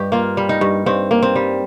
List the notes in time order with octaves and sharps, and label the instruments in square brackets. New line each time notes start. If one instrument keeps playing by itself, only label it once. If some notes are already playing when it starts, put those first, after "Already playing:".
Already playing: [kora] G2 G4 D#5
A#3 F4
G3
D#4
G2
G2 C4
A#3
C4
G3